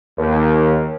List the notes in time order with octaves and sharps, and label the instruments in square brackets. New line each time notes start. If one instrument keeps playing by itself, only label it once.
[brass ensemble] D#2